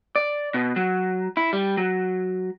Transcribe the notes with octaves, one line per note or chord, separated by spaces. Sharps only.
D5
B2
F#3
E4
G3
F#3